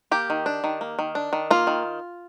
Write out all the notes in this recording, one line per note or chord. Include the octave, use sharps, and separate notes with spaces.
A#3 G4
D#3
D4
D#3
A#3
D#3
D4
D#3
A#3 F4
D#3